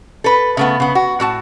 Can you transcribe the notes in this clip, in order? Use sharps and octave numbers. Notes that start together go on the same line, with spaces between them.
A4 B4
C#3 A3 B3
C#3 B3
F#4
A2 F#4 A5